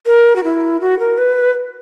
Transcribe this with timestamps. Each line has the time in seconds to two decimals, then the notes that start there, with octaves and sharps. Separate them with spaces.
0.06 A#4
0.36 F#4
0.44 E4
0.81 F#4
0.99 A#4
1.18 B4